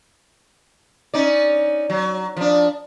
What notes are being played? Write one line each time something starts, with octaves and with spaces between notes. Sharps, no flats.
C#4 D#4 D5
F#3
F3 D4